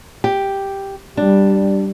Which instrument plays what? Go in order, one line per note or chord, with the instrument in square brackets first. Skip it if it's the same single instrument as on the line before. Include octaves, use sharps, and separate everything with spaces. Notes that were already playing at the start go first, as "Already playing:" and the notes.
[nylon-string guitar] G4
[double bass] G3 [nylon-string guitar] D4